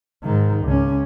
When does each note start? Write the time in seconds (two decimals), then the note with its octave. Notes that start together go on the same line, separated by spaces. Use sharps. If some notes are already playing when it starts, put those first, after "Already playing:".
0.23 G#2 D#3
0.65 C#2 C#4